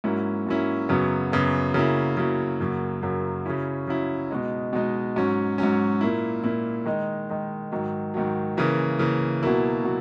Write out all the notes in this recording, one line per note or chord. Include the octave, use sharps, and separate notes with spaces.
G#2 F#3 A#3 C#4 E4
G#2 F#3 A#3 C#4 E4
F#2 C#3 F#3 B3
F#2 C#3 F#3 B3
C#3 F#3 A#3 E4
C#3 F#3 A#3 E4
F#2 C#3 F#3 A#3
F#2 C#3 F#3 A#3
C#3 F#3 C#4 E4
C#3 F#3 C#4 E4
B2 G#3 D#4
B2 G#3 D#4
G#2 F#3 C#4
G#2 F#3 C#4
A#2 A#3 E4
A#2 A#3 E4
D#3 G#3 D#4
D#3 G#3 D#4
G#2 D#3 F#3
G#2 D#3 F#3
C#3 E3 A#3
C#3 E3 A#3
B2 F#3 A#3 E4
B2 F#3